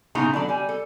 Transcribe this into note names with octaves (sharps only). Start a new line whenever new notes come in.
A2 C#3 B3 D#4 F4 A#5
D3 F#3 D5 A5
G3 G#5
A4